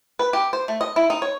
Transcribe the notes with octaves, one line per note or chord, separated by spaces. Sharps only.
B4
G4
C5
A3
D#5
E4
D#4
C#5